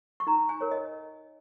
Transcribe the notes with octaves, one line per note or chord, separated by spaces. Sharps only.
C#6
D#4 A#5
G#5
A#4 C#5
D#5